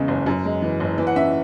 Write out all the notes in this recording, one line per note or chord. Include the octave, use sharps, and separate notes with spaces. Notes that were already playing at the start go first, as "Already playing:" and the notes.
Already playing: E2 C#3 G#3
F#1
F#2
G#3
E3
F#1
E3
F#5
C#4 E5